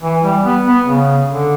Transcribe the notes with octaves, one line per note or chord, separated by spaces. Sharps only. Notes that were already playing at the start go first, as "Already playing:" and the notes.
E3
G3
B3
B3
C#3
D3